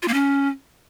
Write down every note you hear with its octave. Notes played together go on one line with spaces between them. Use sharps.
F4
A#3
C#4